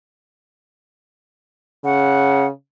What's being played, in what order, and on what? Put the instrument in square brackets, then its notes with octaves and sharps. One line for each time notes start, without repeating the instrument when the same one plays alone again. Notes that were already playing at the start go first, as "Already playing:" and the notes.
[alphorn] C#3 [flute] F#5